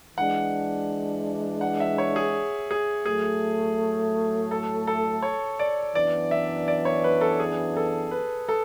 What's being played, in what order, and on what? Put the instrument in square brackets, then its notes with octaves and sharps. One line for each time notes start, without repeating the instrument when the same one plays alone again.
[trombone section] E3 G#3 D4 [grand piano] F#5
[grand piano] F#5
E5
C#5
G#4
G#4
[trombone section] A2 F#3 A3 [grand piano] G#4
[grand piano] A4
A4
C#5
D5
[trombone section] F#2 E3 B3 D4 [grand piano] D5
[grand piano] E5
D5
C#5
B4
A4
G#4
A4
B4
A4